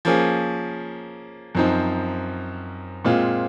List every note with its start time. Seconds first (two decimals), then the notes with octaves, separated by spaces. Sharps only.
0.05 F3 A#3 C#4 G#4
1.55 F#2 F3 C4 D#4
3.05 A#2 G#3 C4 F4